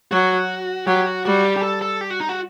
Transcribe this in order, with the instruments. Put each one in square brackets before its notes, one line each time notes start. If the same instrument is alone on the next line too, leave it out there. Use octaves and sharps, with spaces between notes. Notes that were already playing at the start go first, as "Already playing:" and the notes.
[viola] F#3 [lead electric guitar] F#4
[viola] F#3 [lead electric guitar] G4
[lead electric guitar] F#4
[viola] G3 [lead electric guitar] F#4
[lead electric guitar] G4
G4
A4
A4
G4
F#4
D#4
F#4